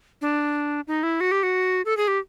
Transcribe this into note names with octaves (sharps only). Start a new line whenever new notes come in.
D4
D#4
E4
F#4
G4
F#4
A4
G#4
G4